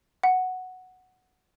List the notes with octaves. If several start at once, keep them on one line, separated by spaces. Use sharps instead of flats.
F#5